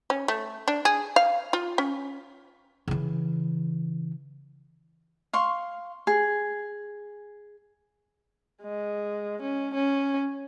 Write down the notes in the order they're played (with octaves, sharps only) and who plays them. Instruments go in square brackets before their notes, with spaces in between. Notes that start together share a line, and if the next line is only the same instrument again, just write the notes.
[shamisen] C#4
A3
D4
G#4
F5
F4
C#4
[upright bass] C#3 E3
[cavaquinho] F5 C6 C#6
G#4
[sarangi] G#3
C#4
C#4